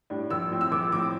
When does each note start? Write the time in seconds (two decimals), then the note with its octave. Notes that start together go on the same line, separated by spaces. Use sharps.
0.10 A2 G3 D4
0.31 A#1 E6
0.51 A2 F3 C4
0.61 E6
0.72 A#1 D6
0.92 A2 F3 C4 D6